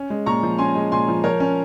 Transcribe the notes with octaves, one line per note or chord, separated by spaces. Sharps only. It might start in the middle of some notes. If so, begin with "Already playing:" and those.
Already playing: C#4
G#3
A#2 A#5 C#6
F3
C#4 G#5 C6
G#3
A#2 G#5 C6
F3
F3 A#4 C#5
C#4